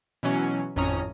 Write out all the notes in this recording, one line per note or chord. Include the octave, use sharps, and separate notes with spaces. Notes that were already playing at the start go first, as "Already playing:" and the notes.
B2 E3 F#3 C#4
G#1 F2 A2 C#4 A#5 D#6